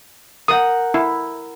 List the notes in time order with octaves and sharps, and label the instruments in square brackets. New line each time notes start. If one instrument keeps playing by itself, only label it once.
[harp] A#4 F#5 G6 [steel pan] D#6
[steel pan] E4